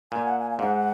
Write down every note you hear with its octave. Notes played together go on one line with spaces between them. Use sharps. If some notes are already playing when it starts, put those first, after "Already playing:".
A#2 G#5
F#5
G#5
F5
G#2 F#5